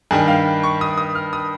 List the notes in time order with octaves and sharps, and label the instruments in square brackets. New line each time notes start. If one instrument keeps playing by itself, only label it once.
[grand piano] G2 D#3 G3 G#4
F5
C#6
D#6
D#6
F6
D#6